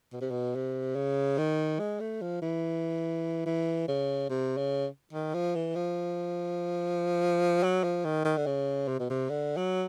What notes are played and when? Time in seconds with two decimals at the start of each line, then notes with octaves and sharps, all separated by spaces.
0.13 B2
0.21 C3
0.30 B2
0.55 C3
0.96 C#3
1.38 D#3
1.79 G#3
2.00 A3
2.22 F3
2.42 E3
3.46 E3
3.88 C#3
4.30 C3
4.57 C#3
5.13 D#3
5.34 F3
5.55 E3
5.75 F3
7.63 F#3
7.83 F3
8.05 D#3
8.25 D#3
8.37 D3
8.46 C#3
8.88 C3
8.99 B2
9.10 C3
9.29 D3
9.57 F#3